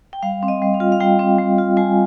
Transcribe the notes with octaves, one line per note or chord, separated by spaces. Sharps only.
G5
G3 F5
C4
D#5
G3
F5
F4
F5
G3 G5
C4
G3
F4
G3 G#5